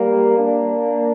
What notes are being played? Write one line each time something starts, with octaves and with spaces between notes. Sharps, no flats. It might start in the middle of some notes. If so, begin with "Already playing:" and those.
Already playing: G3 A#3
A#3 D4